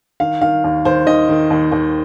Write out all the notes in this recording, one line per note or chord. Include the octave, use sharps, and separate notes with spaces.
D#3 F5
D#3 F5
D#2
D#2 C5
D#3 D#5
D#3
D#2
D#2